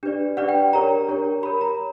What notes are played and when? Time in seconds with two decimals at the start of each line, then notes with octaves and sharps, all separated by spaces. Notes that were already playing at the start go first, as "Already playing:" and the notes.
0.03 D4 G4 B4 D5
0.37 D4 G4 B4 D5 F#5
0.49 G5
0.73 D4 G4 A#4 C#5 A#5
1.08 D4 G4 A#4 C#5
1.43 G4 A#4 C#5 B5
1.61 A#5